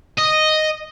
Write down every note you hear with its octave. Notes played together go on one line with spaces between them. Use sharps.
D#5